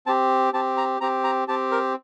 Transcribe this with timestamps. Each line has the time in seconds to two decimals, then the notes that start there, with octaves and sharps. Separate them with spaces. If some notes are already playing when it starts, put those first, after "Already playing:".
0.06 C4 G4 A5
0.53 C4 G4 A5
0.77 A#5
1.01 C4 G4 A#5
1.24 A#5
1.48 C4 G4 A5
1.72 A#4